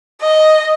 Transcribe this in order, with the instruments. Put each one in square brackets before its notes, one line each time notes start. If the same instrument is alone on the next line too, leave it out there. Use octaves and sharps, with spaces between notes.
[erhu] D#5